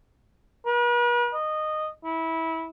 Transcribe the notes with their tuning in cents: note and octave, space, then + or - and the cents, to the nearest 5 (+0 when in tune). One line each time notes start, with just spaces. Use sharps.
B4 -45
D#5 -15
E4 -20